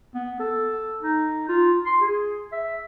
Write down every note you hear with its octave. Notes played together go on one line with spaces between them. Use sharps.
B3
A4
D#4
F4
C6
G#4
E5